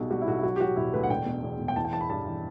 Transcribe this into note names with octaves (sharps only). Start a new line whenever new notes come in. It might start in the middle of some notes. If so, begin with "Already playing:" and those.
Already playing: B1 B2 G3 F#4
G3 F#4
E4
B1 F#4
E4
F#3 F#4
G4
F#3 F#4
E1 E4
D2 B4
F#5
E1 G5
B2
E2
E1
G5
E3 A5
G5
E3 A5
B5
G2 A5
E3